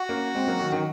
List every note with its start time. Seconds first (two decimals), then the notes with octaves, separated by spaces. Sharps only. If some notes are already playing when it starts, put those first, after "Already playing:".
Already playing: F#4
0.09 A#3 C#4
0.35 G#3 C4
0.47 F#3 A#3
0.59 D#3 F#3
0.72 D#3 F#3